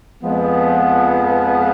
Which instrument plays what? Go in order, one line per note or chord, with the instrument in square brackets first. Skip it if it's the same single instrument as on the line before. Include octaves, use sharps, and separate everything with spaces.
[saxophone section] F2 F3 G#3 B3